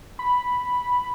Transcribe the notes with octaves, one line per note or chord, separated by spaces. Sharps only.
B5